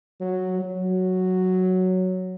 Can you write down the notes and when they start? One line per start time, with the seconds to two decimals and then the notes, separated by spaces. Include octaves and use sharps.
0.21 F#3
0.62 F#3